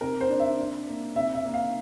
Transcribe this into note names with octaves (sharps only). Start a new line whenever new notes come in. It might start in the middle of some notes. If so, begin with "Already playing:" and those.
C3 A#4
C5
D4
E5
D4
A#3
C3 E5
E5
A#3
F5